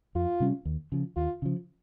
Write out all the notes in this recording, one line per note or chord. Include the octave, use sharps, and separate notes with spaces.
F2 F4
C3 G3 C#4
D#2
C#3 F3
D#2 F4
C#3 F3